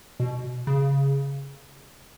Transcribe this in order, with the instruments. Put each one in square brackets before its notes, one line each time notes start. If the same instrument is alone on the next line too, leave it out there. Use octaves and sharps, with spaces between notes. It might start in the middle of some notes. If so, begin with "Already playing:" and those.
[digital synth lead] B2
C#3